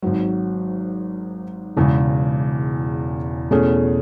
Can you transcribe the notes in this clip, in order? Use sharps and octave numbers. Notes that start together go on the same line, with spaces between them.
G#1 G#2 F#3
E1 E2 C#3 E3
E2 B2 A3 C#4 G#4